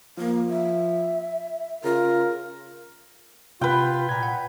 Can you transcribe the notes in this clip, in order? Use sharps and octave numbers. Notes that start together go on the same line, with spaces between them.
F3 A#3
E5
C#3 F4 A#4
C3 F4 B4 G5
A#2 A#5 G#6
F#5